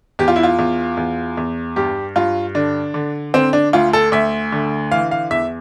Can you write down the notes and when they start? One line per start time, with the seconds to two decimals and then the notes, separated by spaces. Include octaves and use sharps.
0.19 E2 G4
0.28 F4
0.36 E4
0.43 F4
0.59 E2
0.97 E2
1.37 E2
1.76 G2 G4
2.16 G2 F4
2.55 D3 D4
2.94 D3
3.34 D3 C4
3.53 D4
3.73 D2 F4
3.93 A4
4.12 D2 E5
4.52 D3
4.92 E3 F5
5.11 F5
5.31 E2 E5